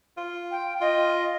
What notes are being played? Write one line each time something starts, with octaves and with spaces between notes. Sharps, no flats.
F4
G5
F4 D#5